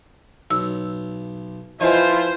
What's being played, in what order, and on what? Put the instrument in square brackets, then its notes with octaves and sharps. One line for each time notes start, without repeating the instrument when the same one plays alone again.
[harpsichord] B1 [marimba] E6
[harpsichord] F3 B4 [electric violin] E4 F4 [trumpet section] C5 [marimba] D#5 E5 G#5